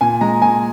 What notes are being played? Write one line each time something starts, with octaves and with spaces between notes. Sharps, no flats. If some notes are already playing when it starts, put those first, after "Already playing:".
A#2 G#5
G#3 A#5
A#2 G#5